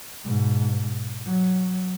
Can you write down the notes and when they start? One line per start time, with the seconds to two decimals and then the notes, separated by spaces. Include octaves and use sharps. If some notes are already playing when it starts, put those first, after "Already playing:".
0.24 G#2 B2
1.25 F#3